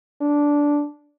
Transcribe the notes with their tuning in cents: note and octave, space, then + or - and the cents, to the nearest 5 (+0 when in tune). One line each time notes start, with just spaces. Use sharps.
D4 -10